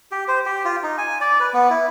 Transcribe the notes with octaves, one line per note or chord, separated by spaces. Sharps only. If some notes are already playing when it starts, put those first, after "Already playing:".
G4
C5
G4
F4
D#4
G#5
D5
B4
B3
E4